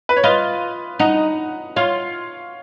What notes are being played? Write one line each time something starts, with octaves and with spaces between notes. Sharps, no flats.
B4
C#5
F4 B4 D#5
D#4 D#5 F#5
F4 C#5 F5